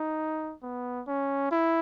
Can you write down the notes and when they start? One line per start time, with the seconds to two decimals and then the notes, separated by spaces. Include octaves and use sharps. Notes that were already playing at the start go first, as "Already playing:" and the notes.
Already playing: D#4
0.63 B3
1.07 C#4
1.51 E4